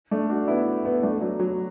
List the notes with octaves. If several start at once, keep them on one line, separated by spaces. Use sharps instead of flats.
A3 D4
D4 F#4
B3 E4
B3 E4
A3 D4
F#3
F#3